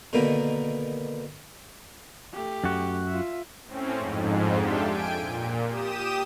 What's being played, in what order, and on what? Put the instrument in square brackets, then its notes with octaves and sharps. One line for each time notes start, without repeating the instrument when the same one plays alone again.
[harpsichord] B2 D3 D#3 A#3 B3
[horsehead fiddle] A3 G4
[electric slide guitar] F#2 F#4
[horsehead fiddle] F4 E5
[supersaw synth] A2 C4 C#4
F2 G#2
D4 F4 G4 A4 E5
G5 G#5 D7
A#2
G4 D#6 E7